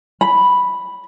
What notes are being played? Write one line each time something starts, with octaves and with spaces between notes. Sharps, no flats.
B5